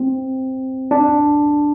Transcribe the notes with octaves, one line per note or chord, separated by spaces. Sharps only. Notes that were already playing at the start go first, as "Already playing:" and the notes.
Already playing: C4
D4